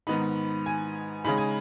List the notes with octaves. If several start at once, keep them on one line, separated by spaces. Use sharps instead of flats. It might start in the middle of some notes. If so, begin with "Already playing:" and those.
G#2 D#3 B3 D#4 B5
G#5
C#3 G#3 D#4 B5
G#5